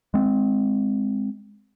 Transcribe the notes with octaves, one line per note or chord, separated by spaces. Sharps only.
G#3 C4